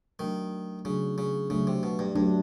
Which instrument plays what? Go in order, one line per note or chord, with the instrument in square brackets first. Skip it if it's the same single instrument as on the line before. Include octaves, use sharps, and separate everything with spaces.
[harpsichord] D#3 [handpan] F#3 A3 D4
[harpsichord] C#3 [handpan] F#3 A3 D4
[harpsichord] C#3
[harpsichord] C#3 [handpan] F#3 A3 D4
[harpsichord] C3
B2
G2
[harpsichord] G2 [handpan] F#3 A3 D4